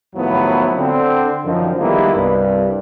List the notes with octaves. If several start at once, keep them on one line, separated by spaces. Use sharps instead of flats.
D#2 A2 F3 F#3 B3 E4
D3 C4
F#2 D3 D#3 F3
D#3 G3 G#3 A#3 B3 E4
C2 G2